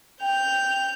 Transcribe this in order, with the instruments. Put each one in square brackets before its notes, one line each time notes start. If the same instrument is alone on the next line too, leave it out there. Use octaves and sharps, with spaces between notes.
[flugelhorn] G5 [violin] G6 F7